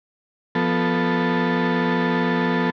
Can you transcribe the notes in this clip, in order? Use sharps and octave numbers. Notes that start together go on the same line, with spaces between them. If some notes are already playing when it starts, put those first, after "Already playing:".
F3 B3 A4